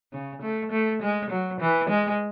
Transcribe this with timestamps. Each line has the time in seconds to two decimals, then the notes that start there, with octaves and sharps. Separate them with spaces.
0.12 C#3
0.42 A3
0.72 A3
1.02 G#3
1.30 F#3
1.61 E3
1.90 G#3